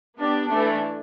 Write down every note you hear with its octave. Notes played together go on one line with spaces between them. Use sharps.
B3 D4 G4
E3 A3 D4